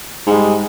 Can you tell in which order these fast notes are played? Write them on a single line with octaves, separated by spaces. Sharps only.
G#2 G#3 G3